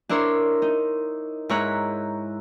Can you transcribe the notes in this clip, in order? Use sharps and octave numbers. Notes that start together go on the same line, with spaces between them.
D4 E4 A#4 C5 C#5
D#4
G#2 E4 C#5 A#5 F#6